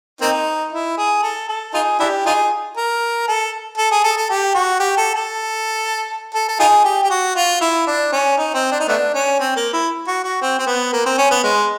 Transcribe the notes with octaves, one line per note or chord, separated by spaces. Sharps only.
A#3 C4 D#4
E4
G#4
A4
A4
D#4 F4 G#4
D4 E4 G4
D#4 F4 G#4
A#4
A4
A4
G#4
A4
A4
G4
F#4
G4
A4
A4
A4
A4
D#4 F4 G#4
G4
G4
F#4
F4
E4
D4
C#4
D#4
C4
D4
D#4
A3 B3 D4
C#4
C4
A#3
E4
F#4
F#4
C4
C4
B3
A#3
C4
C#4
B3
G#3